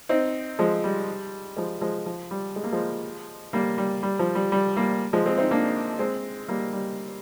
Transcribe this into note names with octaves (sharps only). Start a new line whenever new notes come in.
C4 D#4
F3 G#3
G3
F3 G#3
F3 G#3
F3
G3
G#3
A#3
F3 G#3
G3 A#3
G3
G3
F3
G3
G3
G3 A#3
F3 G#3
G#3 C4
C4 D#4
A#3 D4
G#3 C4
G3 A#3
G3